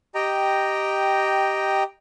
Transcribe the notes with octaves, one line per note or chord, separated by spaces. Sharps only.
G4 D#5 G5 A#5